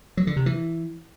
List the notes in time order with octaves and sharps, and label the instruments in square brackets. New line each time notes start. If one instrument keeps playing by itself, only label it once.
[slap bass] F#3
D3
C3
E3